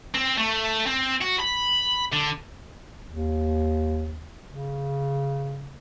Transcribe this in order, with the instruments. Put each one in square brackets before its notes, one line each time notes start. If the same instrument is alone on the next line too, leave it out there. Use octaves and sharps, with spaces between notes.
[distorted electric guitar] C4
A3
C4
F#4
B5
D3
[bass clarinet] D#2
C#3